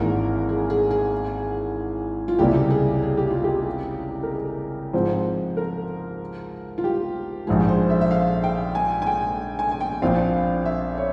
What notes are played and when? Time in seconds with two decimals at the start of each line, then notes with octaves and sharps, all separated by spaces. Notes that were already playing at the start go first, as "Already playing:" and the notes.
Already playing: G#1 G#2 E3 A#3 A#4
0.49 G#4
0.70 G#4
0.91 G#4
2.28 F4
2.39 C#2 C3 G3 A#3 E4 G4
2.70 G#4
3.02 G#4
3.17 G4
3.30 F4
3.44 G4
4.23 A#4
4.30 G#4
4.93 G#2 F3 C4 C5
5.57 A#4
6.78 F4
6.84 G4
7.47 A#1 G#2 F3 G#3 G#4
7.69 C5
7.90 E5
8.01 E5
8.11 F5
8.44 G5
8.75 G#5
9.02 G#5
9.07 G5
9.59 G#5
9.72 G#5
9.81 G5
10.02 A#1 A#2 F3 C4 F4 F5
10.65 E5
10.98 C#5